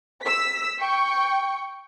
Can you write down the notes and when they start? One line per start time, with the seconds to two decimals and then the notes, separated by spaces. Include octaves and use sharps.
0.23 E6 B6
0.80 G5 C#6